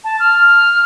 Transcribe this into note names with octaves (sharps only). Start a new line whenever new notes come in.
A5
F6